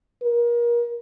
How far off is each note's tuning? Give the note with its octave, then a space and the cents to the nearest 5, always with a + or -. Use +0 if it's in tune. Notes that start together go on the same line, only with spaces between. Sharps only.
A#4 +30